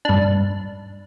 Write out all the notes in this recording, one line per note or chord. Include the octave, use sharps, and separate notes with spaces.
G2 D4